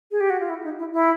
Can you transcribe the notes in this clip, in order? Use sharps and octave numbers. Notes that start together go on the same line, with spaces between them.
G#4
G4
F#4
F4
E4
D#4
E4
E4